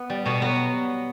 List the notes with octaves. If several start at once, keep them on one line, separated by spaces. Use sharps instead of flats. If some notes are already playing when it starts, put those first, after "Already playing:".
Already playing: B3
G3
B2 B3
F#3 B3